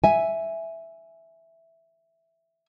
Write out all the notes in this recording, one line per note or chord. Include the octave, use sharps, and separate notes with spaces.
E5 G#5